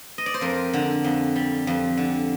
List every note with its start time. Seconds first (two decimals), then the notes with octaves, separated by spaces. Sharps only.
0.18 D#5
0.26 D5
0.34 C5
0.41 F2 A#4
0.74 D3
1.04 F2
1.36 G3
1.67 F2
1.97 D3